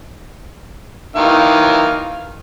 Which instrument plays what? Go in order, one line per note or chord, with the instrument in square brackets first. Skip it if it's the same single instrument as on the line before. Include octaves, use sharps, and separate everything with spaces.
[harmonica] D#3 E3 F5